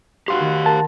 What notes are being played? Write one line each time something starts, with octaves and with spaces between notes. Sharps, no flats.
F#4 G4 F5 C6
D#3
A#4 A5